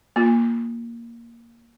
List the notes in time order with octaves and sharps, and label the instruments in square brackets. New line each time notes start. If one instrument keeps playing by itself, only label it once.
[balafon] A#3 F4